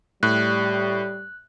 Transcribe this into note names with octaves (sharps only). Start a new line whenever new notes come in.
A2 G3 F#6